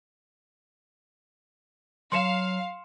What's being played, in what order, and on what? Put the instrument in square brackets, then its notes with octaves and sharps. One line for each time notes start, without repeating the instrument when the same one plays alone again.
[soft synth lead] F#3 [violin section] F5 [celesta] C6 C#7 E7